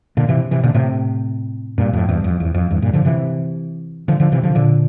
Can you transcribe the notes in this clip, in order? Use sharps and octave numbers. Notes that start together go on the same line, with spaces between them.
A#2 D3
C3 E3
C3 E3
A#2 D3
A2 C3
G2 A#2
F2 A2
E2 G2
F2
E2
F2
E2 G2
G2 A#2
D3 F3
C3 E3
D3 F3
D3 F3
C3 E3
D3 F3
A#2 D3